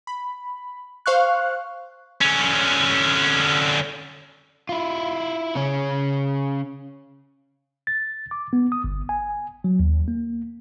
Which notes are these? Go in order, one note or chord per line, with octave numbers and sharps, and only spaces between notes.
B5
C5 F5 C#6 F#6
D3 C#4
E4 F4
C#3 C#4
A6
D6
B3
D#6
G1
G#5
F#3
D#2
A#3